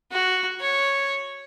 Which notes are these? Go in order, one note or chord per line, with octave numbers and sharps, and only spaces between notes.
F#4
C#5